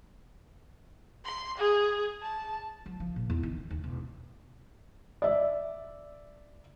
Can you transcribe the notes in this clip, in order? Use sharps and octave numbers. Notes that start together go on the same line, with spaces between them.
C6
G#4
A5
F#3
F3
A#2
E2
D#3
C4
D#2
E1
D5 E5